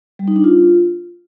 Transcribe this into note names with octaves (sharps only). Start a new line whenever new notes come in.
G3
D#4
D4
F4